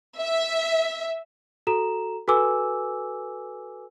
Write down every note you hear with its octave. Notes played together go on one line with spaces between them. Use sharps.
E5
F#4 A4 A#5 E7
F#4 A4 B4 G#5 D6 E6